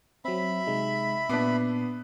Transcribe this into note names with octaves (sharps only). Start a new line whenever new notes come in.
F#3 C4 E5 B5
C3 G#3 D#4
A#2 B3 D4 D6 C7